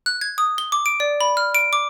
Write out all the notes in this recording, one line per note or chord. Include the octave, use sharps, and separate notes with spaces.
F#6
G#6
D#6
G7
D6
D7
D5
B5
F6
D7
D6